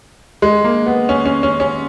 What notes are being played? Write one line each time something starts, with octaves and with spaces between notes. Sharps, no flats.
G#3
A#3
B3
C#4
C#4
C#4
C#4